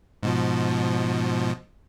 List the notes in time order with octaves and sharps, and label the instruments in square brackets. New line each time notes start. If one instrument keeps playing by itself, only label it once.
[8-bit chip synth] G#2 B2 F3